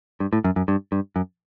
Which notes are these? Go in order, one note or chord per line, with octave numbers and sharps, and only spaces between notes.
G2
A2
F#2
F#2
G2
G2
F#2